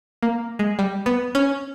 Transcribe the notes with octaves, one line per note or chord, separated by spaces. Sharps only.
A#3
G#3
G3
B3
C#4